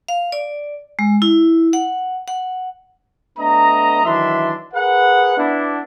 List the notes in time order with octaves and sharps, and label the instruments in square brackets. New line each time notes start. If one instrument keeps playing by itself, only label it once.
[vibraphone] F5
D5
G#3
E4
F#5
F#5
[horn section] A3 B3 D4 D#5 A#5
D#3 E3 F#3 D4 E5 C6
G#4 A#4 B4 F#5
B3 D4 E4